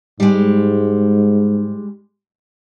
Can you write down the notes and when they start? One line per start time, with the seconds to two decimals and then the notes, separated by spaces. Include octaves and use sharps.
0.20 G#2 G3 G#3